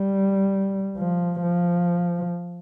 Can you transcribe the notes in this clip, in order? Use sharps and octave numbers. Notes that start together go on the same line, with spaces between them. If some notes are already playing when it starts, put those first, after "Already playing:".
Already playing: G3
F3
F3